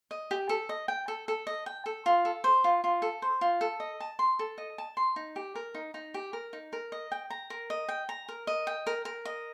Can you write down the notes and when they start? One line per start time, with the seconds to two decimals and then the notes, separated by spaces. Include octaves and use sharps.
0.11 D#5
0.31 G4
0.49 A4
0.69 D#5
0.88 G5
1.08 A4
1.28 A4
1.47 D#5
1.66 G5
1.86 A4
2.06 F4
2.25 A4
2.44 C5
2.64 F4
2.84 F4
3.02 A4
3.22 C5
3.41 F4
3.61 A4
3.80 D#5
4.00 A5
4.19 C6
4.39 A4
4.58 D#5
4.78 A5
4.97 C6
5.16 D#4
5.36 G4
5.55 A#4
5.75 D#4
5.94 D#4
6.14 G4
6.33 A#4
6.53 D#4
6.73 A#4
6.92 D#5
7.12 G5
7.30 A#5
7.50 A#4
7.70 D#5
7.88 G5
8.09 A#5
8.29 A#4
8.47 D#5
8.67 G5
8.87 A#4
9.05 A#4
9.25 D#5